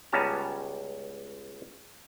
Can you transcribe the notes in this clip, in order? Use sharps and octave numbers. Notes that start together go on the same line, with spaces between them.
C#2 G3 B3 C#4 A5 A#5